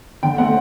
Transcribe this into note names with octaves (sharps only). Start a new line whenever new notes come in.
D3 G5
A3 C4 F#5